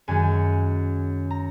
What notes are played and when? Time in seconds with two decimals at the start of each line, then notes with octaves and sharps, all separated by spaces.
0.08 F#2 D#3 G#3 G#5
1.31 A#5